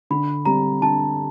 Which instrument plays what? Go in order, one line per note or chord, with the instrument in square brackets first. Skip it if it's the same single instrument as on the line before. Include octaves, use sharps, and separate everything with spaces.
[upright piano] D3 [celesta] B5
[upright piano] G3 C4 [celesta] A#5
[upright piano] D3 [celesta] A5